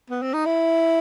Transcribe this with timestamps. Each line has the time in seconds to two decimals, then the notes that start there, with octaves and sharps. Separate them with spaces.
0.10 B3
0.22 C4
0.34 D#4
0.45 E4